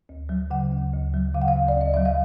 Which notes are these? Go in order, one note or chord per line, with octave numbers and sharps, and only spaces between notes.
D2
F#3
C#3 F#5
D2
D2
F#3
C#3 F5
F#5
F5
D2
D5
D2 D#5
F#3 E5
F5